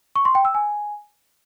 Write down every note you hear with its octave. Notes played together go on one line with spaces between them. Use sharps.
C#6
C6
G5
E6
G#5